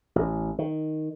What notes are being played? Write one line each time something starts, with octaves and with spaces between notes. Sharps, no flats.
A1
D#3